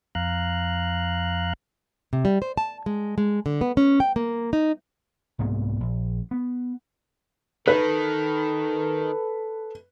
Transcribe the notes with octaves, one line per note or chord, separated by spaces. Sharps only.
F2 F5 A#5 F#6
C3
G3
C5
A5
G#3
G#3
D3
B3
C#4
G5
A#3
D#4
C2 G#2 A#3 B3
A#1
B3
D#3 A4 B4